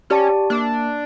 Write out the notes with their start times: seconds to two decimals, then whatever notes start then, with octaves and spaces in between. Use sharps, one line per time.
0.10 C#4 G4 D5 A5
0.50 A#3 D4